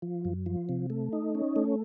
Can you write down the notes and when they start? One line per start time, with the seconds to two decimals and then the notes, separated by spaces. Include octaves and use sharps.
0.02 F3
0.25 F#2
0.46 F3
0.69 C3
0.90 A3
1.13 D#4
1.35 C#4
1.56 A3